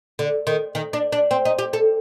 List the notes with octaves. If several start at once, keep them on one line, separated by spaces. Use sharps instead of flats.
D3
D#3
D#3
D4
D4
C4
D#4
G4
A4